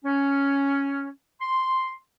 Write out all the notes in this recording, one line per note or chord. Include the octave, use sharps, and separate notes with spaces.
C#4
C6